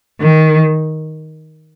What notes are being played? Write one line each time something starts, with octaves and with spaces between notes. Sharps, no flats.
D#3